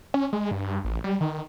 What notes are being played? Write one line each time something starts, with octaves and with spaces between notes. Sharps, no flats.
C#4
G#3
G2
A1
G3
D#3